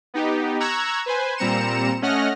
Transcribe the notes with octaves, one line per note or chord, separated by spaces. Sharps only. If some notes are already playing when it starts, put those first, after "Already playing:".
B3 D#4 G4
A#5 C#6 E6 F#6 G#6
B4 C5 G#5
A#2 G3 C4 A#5 C#7 E7
A3 C#4 D#5 F#5 F6 A#6